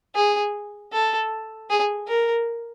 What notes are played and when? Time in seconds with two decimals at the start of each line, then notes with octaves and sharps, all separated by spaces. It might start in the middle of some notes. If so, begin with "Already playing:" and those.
0.15 G#4
0.93 A4
1.70 G#4
2.08 A#4